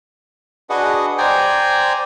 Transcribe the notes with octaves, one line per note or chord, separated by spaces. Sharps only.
D4 F#4 G#4 B4 D#5 F#5
C5 D5 G5 G#5 A#5